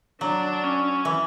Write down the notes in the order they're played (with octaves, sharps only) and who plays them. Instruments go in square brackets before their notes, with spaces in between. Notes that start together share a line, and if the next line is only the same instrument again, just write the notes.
[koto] F#3 [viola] D4
[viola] C#4
[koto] E3